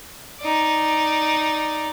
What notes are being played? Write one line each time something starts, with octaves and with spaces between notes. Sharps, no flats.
D#4 D5